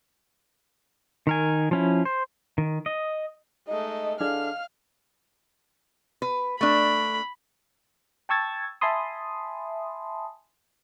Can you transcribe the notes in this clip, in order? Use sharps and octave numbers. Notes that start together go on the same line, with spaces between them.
D#3 A#4 G#5
F3 C#4 E4
C5
D#3
D#5
G#3 A3 D#4 D#5
D3 D4 G#4 F5 F6
B4
A3 D4 B5
G5 A5 C#6 E6 G#6 A6
E5 G#5 A5 B5 C6 D#6